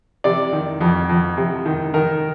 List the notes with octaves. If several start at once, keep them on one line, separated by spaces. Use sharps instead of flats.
C3 D5
D#3
F2
F2
C3
D#3
D#3 A#4